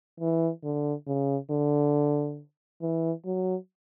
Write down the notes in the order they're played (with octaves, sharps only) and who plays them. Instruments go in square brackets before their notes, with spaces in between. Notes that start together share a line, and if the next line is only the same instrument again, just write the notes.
[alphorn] E3
D3
C#3
D3
E3
F#3